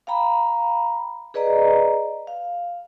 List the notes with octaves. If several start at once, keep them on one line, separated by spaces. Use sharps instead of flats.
F5 G5 A#5 B5
G#4 B4 D5 D#5 A#5
F5